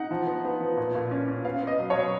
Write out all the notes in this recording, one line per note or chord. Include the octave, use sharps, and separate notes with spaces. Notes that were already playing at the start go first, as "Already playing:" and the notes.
Already playing: D#4 F#5
F3
B3
B3
F3
A#2
A#2
C#4
C#4
B3 F5
B3 D#5
F#3
C#5
F#3